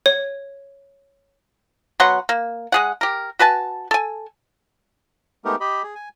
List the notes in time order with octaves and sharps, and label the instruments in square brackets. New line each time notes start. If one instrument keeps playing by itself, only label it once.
[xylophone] C#5
[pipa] F#3 B3 F#5 C6
A#3
G#3 G#4 F#5
G4 A#4
F#4 B4 G#5 A5
A4 G#5
[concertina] G#3 A3 B3 D#4 G4 A#4
G4 D#5 B5
G#4
G#5